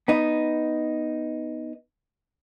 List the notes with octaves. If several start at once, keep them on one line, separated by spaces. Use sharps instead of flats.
B3 D#4